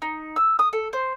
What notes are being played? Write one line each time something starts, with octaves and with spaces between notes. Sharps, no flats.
D#4
E6
D#6
A4
C5